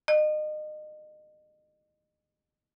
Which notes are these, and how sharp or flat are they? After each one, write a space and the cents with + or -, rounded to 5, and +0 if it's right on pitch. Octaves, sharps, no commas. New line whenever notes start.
D#5 -30